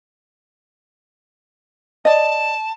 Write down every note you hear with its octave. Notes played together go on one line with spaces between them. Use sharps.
D5 D#5 A5